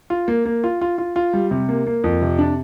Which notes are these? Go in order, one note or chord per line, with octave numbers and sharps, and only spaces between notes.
F4
A#3
A#3
F4
F4
F4
F4
G3
C3
A#3
A#3
F2
C3
D4